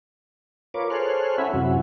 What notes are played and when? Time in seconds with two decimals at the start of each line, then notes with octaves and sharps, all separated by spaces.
0.74 F4 A#4 B4 C#5 D6
0.90 G#4 A4 C5 C#5 F6 F#6
1.38 C#4 E4 E5 F#5 G#5 B5
1.54 F#2 C3 F#3 E4 F#4